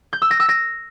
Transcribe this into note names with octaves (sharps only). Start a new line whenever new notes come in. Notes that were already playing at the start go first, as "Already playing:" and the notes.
G6
E6
A#6
E6
A#6